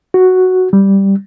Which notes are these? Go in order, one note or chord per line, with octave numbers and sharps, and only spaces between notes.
F#4
G3